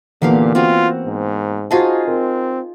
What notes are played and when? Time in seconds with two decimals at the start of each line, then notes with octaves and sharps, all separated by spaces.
0.22 A#2 D3 E3 A#3 B3 G4 F5
0.55 C4 F4 F#4
1.07 G#2
1.71 D#4 F4 F#4 G#4 C5 A5
2.08 C4 A#4